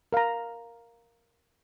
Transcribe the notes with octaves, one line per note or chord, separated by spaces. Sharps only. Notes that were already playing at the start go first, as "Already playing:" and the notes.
A#4 F5 A#5